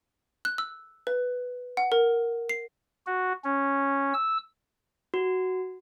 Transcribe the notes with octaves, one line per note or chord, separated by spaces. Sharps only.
F#6
E6
B4
F#5
A#4
C7
F#4
C#4
E6
F#4